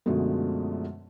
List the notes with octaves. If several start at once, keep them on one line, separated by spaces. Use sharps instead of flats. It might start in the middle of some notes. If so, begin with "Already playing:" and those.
F#2 B2 D3 F3 G#3 A3